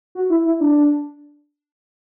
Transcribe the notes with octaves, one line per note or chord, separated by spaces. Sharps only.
F#4
E4
E4
D4